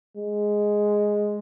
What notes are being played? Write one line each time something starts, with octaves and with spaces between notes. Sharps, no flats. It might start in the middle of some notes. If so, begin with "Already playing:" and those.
G#3